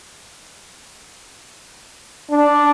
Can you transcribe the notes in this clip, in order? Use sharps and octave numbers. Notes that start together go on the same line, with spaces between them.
D4